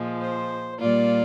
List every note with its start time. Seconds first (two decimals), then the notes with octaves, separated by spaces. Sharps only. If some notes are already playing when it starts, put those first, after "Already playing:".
Already playing: A#2 F3 G#3
0.21 C5
0.79 A#2 G3 A#3 F4 D5